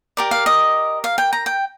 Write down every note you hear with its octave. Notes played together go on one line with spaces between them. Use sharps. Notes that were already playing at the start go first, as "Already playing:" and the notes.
G4 A#4 D5
F5
D#5
F5
G5
A#5
G5